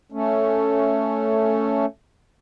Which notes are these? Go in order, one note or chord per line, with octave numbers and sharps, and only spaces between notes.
A3 C#4